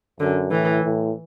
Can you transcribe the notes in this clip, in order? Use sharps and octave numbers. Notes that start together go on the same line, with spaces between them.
F#2 D3
A2 E3
A2